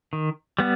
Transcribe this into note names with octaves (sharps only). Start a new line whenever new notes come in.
D#3
G3 B3